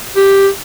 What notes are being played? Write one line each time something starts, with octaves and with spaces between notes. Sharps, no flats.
G4